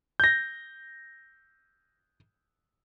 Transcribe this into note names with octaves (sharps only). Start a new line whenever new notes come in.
G6 A#6